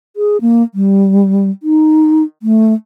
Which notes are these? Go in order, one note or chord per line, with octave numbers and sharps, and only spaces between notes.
G#4
A#3
G3
D#4
A3